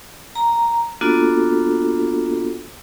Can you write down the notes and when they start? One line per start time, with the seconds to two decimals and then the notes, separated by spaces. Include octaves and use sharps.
0.35 A#5
1.01 A#3 B3 D4 F4 F#4 A4